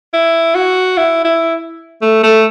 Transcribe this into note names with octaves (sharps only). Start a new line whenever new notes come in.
E4
F#4
E4
E4
A3
A3